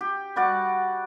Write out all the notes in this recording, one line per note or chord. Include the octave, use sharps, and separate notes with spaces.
G4
G3 F#4 D5 F#5